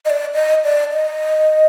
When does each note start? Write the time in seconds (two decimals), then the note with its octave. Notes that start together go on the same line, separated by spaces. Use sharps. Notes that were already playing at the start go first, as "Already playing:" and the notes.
0.05 D#5
0.10 D5
0.34 D#5
0.64 D5
0.92 D#5